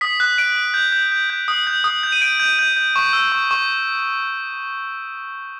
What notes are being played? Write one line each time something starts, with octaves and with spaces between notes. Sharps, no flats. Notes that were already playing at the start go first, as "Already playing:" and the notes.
D#6 B6
F#6
F#6 D7
F#6
G6
G6
G6
G6
D#6
G6
D#6
G6
D#7
G6 D7
G6
G6
G6
C#6
E6
C#6
C#6